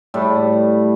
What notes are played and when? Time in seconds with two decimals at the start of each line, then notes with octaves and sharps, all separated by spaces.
0.14 A2 G3